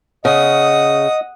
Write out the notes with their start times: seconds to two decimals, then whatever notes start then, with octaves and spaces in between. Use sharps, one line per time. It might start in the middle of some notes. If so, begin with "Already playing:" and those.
0.25 C#3 D#5 F#5 D#6